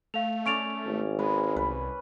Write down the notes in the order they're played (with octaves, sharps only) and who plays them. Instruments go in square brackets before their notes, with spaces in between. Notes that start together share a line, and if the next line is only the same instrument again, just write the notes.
[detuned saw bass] A3 [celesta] F5 F7
[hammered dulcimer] C#4 D5 [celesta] C#6 D7 F7
[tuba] G#1
[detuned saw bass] G#3 [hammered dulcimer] B4
[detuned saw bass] C2 [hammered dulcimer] B4